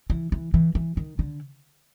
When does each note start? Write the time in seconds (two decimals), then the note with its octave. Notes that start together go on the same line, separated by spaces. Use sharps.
0.10 E3
0.32 E3
0.54 E3
0.75 E3
0.97 D#3
1.19 D3